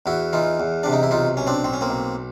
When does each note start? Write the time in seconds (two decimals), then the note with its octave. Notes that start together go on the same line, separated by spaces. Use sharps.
0.06 E2 E4 F#4
0.33 E3 D#4 F4
0.60 E2
0.83 C3 D4
0.93 D#4
1.03 E4
1.11 B1 D#4 F4
1.37 B1 C#4
1.47 C4 D4
1.64 B1 C4
1.73 C#4
1.81 A#3 C4
1.90 B1